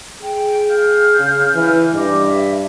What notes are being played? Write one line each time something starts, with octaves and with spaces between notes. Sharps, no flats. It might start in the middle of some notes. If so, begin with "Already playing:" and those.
G#4 G5
F5 F6 G6
C#3
E3
G2 D#5 D6
E5